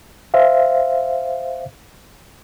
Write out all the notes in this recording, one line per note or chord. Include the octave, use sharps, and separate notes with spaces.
C5 E5 F5